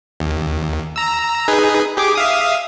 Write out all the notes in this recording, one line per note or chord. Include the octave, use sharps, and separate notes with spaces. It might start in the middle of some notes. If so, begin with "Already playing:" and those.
D#2
A#5 E6
D#4 G#4 B4
G4 G#4 D6
E5 F5 D#6